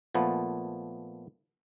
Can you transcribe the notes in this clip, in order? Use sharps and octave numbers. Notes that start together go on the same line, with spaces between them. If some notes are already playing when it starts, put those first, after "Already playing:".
A#2 F3 A3 B3